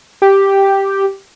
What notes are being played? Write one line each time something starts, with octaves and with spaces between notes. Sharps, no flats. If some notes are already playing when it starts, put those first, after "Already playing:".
G4